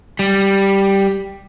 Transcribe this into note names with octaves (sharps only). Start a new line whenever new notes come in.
G3